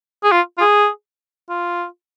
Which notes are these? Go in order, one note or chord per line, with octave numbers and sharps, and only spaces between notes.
G#4
F4
F4
G#4
F4